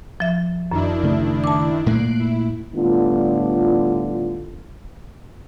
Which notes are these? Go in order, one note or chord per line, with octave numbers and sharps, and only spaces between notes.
F3 E5 A6
F#2 D#3 D4 E4
C#3 A3
A5 D6
A#2 A3 A#3 F#6 C7 D7
E4
A2 D3 G3 B3 F4